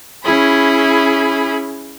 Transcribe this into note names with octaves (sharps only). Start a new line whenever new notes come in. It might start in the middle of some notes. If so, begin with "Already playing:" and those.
C#4 E4 G#4 B5